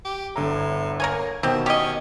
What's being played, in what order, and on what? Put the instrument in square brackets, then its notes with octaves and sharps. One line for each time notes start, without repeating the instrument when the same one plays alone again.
[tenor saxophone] G4
[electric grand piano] G1 D3 A#5 [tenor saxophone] A2
[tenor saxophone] A#3 [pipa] A#4 C#5 G#5
[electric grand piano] B2 D#3 [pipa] C4 G4 [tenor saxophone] E5
[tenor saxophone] C#4 [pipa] G4 D#5